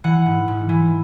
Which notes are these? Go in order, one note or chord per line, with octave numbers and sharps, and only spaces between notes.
E3 F#5
G#2
G#2
E3